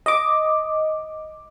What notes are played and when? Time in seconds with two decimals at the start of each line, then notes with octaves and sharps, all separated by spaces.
0.06 D#5 D6